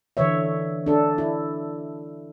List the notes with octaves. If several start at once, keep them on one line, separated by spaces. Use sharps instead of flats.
D3 E3 C#5 E5
D4 A4
E4